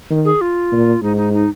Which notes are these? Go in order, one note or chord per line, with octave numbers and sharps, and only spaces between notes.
D#3
G#4
F4
A#2
G#2 D#4
D#4
D#4